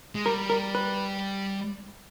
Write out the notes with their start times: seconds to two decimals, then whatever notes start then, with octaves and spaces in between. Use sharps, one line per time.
0.15 G#3
0.26 G3 A#4
0.50 A#4
0.75 B4